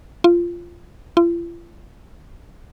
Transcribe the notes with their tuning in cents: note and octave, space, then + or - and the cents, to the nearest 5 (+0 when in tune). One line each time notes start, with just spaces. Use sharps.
F4 -15
F4 -45